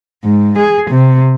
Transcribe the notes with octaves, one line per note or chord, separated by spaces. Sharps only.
G#2
G#4
C3